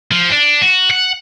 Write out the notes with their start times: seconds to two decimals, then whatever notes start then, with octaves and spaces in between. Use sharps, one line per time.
0.12 F3
0.31 D4
0.62 F#4
0.91 F#5